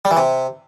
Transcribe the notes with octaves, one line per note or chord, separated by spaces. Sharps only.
G3
E3
C3